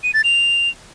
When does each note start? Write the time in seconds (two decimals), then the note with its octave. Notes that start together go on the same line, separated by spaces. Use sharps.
0.04 D#7
0.14 A6
0.24 F7